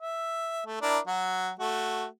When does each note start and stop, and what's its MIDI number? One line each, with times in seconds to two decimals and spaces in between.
0.01 0.61 76
0.65 0.78 57
0.81 0.98 62
0.81 0.98 64
0.81 0.98 70
1.07 1.51 54
1.07 1.51 66
1.59 2.05 57
1.59 2.05 66